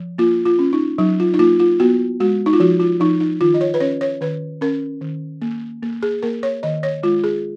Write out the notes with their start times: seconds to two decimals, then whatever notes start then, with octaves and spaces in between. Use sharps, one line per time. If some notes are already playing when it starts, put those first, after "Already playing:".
Already playing: F3
0.18 A#3 F4
0.45 F4
0.59 C#4
0.73 D#4
0.98 F#3 D#4
1.20 F4
1.34 D#4
1.39 A#3 F4
1.60 F4
1.80 B3 F#4
2.20 G#3 F#4
2.46 D#4
2.53 F4
2.60 F3 F#4
2.80 F4
3.00 F3 D#4
3.20 D#4
3.41 D#3 F4
3.54 D#5
3.61 C#5
3.74 B4
3.80 C#4 C#5
4.01 C#5
4.21 D#3 B4
4.61 C#4 A#4
5.01 D#3
5.42 A#3
5.83 A#3
6.03 G#4
6.23 A#3 A#4
6.43 C#5
6.63 D#3 D#5
6.83 C#5
7.03 G#3 F4
7.24 G#4